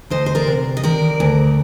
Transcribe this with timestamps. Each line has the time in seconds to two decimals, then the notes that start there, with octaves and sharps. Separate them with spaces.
0.10 D2 C5 D#5
0.26 C5
0.35 A#4 D5
0.47 C3
0.77 D#5
0.83 D#3 A#4 D5
1.20 D2